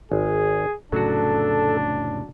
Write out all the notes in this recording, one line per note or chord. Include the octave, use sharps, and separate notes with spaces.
G#1 G#4
F1 A2 C#3 F#3 D4 F#4 A4